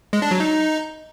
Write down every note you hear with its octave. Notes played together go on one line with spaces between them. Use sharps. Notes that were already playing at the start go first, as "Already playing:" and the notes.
G#3
D4
F#3
D#4